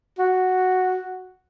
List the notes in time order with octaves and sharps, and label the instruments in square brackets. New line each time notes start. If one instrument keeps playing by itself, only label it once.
[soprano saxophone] F#4